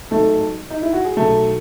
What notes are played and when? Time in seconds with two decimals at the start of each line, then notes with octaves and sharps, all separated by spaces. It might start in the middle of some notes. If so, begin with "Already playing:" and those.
0.11 A1 G#2 F#3 A3 A4
0.71 D#4
0.82 E4
0.93 F#4
1.05 G#4
1.17 B1 B2 F#3 A3 A4